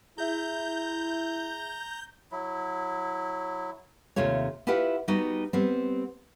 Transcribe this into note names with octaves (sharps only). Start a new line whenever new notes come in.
E4 G#4 E5 A#5 G6
F#3 E4
D#2 C3 A3 F4 C#5
E4 F4 G4 B4 F#5
G3 B3 D#4 F#4
G3 B3 C4